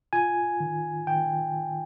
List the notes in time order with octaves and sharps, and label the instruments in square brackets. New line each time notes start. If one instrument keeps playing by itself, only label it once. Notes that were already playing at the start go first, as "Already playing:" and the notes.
[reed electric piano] F4 [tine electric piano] G#5
[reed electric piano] D#3
[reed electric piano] D#3 [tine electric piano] G5